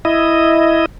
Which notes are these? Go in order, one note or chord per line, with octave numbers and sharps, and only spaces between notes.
E4 D#5